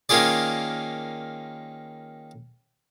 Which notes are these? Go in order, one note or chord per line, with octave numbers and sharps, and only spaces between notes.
D#3 A#3 C#4 F4 G#4 D5